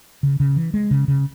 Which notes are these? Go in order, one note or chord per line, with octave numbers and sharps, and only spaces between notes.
C#3
C#3
E3
G#3
C#3
C#3